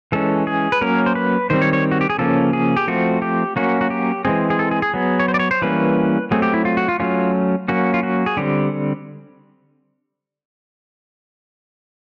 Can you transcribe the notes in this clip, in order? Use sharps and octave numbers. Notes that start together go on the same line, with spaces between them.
E3 G#3 C#4 A4
G#4
B4
F#3 A#3 C#4 A#4
C5
B4
D#3 G3 C4 C5
C#5
C#5
F#4
G4
G#4
C#3 F3 A#3 C#4 A4
G#4
G4
F3 A3 C4 F#4
G4
F#3 A#3 C#4 F#4
F#4
G4
E3 G#3 C4 G#4
G#4
A4
G#4
G#4
F#3 B3
C#5
C5
D5
C#5
C5
E3 G3 A#3 C#4 B4
F#3 A3 C4 G#4
G4
E4
F4
F#4
F4
F#3 A3 C#4 F4
F#3 A#3 C#4 F#4
F4
F#4
G#4
D3 G3 C4 G4